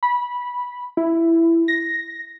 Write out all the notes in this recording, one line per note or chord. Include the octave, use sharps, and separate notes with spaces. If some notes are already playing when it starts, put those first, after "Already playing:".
B5
E4
A#6